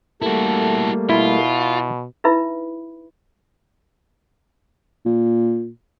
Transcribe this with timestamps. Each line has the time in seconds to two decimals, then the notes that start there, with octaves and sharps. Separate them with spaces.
0.22 G3 A3 A#3 E4 F#4 A4
1.09 B2 E4 F4
2.24 D#4 E4 B4 E5 B5
5.06 A#2